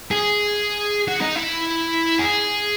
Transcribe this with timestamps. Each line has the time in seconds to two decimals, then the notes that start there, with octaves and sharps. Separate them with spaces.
0.11 G#4
1.08 F#4
1.22 D#4
1.36 E4
2.19 G#4